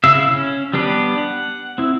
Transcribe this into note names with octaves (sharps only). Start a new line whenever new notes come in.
C#3 E4 E5 F5 E6
C#4
G3 B3 D4 G4 B4
F#5
C4 E4